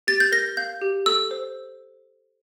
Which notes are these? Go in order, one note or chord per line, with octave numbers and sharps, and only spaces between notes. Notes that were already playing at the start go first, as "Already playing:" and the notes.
G4 A6
G6
A#4 A#6
F5 G6
G4
A4 E6
C5